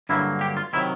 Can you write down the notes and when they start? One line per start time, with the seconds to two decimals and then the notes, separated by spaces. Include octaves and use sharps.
0.09 G2 D3 F#3 A#3 E4
0.41 G4
0.57 F4
0.73 C3 D#3 F#3 E4